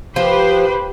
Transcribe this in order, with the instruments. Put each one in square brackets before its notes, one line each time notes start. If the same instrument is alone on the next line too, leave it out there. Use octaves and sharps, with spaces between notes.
[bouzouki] F3 [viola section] G4 B4 [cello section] C5